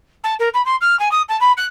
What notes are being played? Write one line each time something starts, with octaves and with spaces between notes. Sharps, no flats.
A5
A#4
B5
C6
F6
G#5
D#6
A5
B5
F#6